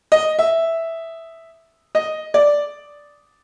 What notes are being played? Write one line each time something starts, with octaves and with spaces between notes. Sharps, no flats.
D#5
E5
D#5
D5